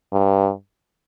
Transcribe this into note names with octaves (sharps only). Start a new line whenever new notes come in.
G2